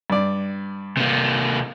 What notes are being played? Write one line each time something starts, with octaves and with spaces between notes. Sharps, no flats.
G2 D5
C3 A#3